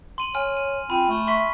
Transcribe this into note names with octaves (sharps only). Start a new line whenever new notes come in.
C6 D#7 F#7
C#5 G#5 F6
D#7
C4 F4 B5 D#7
A3
E5 C6 C#6 B6